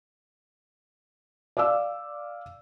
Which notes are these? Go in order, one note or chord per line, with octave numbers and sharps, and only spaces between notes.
D5 F5 D6 E6